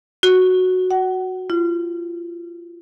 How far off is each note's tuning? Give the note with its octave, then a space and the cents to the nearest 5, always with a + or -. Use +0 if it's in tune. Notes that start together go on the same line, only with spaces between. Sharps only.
F#4 -5
F#5 +30
F4 -35